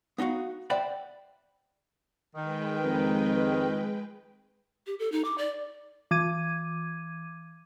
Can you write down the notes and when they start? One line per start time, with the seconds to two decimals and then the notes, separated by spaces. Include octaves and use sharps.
0.18 B3 D#4 F4 F#4 F5
0.70 C5 D5 E5 F#5 G5 B5
2.35 D#3 G#3 B4 G5
2.84 F2
4.87 G4
4.99 A4
5.12 D#4
5.25 D6
5.38 D5
6.11 E3 D6 G#6 D#7